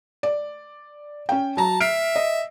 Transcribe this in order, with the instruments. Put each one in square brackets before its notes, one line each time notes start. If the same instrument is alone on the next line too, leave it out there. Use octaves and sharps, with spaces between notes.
[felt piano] D5
C#4 G5
[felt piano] F#3 A#5 [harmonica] A5
[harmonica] E5 [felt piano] F6 C7 D7
[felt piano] D#5